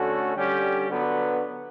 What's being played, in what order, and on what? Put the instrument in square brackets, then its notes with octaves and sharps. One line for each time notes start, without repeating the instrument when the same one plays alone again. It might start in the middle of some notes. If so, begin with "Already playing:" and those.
Already playing: [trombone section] D3 A3 C#4 F#4
D3 G3 C#4 G4
D3 F#3 B3